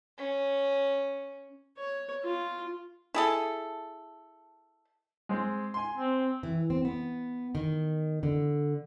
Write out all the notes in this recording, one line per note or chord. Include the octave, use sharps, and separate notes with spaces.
C#4
C#5
F4
E4 G#4 A4
G#3 C4
G#5 C6
C4
E3
C4
B3
D#3
D3